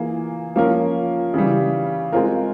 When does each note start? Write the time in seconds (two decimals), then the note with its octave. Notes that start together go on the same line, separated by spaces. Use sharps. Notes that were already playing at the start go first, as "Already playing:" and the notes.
Already playing: E3 A#3 F4 G#4
0.56 F3 A#3 C#4 F4 A#4
1.34 C#3 E3 G3
2.12 G#3 C4 F4 A#4